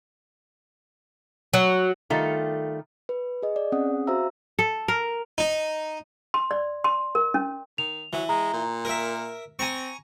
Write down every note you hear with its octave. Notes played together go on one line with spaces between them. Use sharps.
F#3
D#3 G3 A3 F4 A4
B4
G#4 D#5
D5
C4 C#4 G#4 F#5 D#6
F#4 C5 E5 F5 A#5 E6
A4
A#4
D#4
C6
D5
C6
A#4
C#4
D#3 F7
E3 F#3
G#3 A#5
A#2
A#4 E5
C4 G#5 A#5 C#6